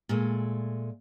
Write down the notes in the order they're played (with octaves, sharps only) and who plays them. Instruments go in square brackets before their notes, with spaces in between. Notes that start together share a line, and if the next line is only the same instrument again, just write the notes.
[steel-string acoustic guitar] A#2 G#3 A3